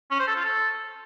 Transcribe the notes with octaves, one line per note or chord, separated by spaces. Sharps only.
C#4
C5
A4
F4
A4